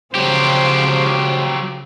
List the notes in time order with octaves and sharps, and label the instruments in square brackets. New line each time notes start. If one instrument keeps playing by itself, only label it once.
[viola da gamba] C#3 F3 C5 [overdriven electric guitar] F#3 G4